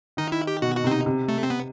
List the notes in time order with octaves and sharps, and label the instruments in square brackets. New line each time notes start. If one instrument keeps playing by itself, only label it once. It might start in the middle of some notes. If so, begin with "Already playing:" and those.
[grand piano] D#3 [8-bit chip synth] D#4
[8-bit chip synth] E4
G4
[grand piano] B2 [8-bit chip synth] F#4
[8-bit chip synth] F#4
[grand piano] C3 [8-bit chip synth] C4
[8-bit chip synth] D#4
[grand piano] C3
[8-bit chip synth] A3
C4
B3